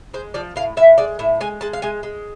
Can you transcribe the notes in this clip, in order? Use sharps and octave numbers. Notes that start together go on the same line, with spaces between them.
G#3 C5
F3 D5
A2 F5
A2 E5
G#3 D5
A2 E5
G#3 G#5
G#3 A5
F5
G#3 G#5
G#3